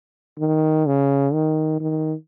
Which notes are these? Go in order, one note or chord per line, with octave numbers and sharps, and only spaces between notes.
D#3
C#3
D#3
D#3